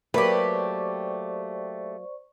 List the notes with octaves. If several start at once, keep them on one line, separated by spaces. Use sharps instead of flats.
F#3 A3 A#3 G4 B4 C5 D5 C#6